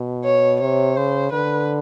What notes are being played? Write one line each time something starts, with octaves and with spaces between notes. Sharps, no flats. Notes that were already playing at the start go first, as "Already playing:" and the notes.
Already playing: B2
C#5
C3 C#5
C#3 C5
D3 B4